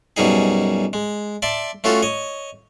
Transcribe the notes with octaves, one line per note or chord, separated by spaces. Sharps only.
F#2 B2 G3 D#4 G#4
G#3
D5 E5 A5 C6
A3 C#4 F4 F#4 A4
C#5 D#5